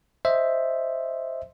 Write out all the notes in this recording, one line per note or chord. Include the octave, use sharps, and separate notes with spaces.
C5 D#5 E5